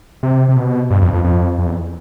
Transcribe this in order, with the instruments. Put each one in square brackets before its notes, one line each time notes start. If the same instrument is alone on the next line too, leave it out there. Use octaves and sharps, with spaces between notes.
[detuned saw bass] C3
C3
B2
G2
F2
F2
F2
F2
E2